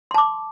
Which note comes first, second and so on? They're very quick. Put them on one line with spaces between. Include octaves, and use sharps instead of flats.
C6 A5 D6